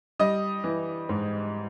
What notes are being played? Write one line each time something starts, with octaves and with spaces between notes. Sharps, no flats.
G3 D#5 D#6
E3
G#2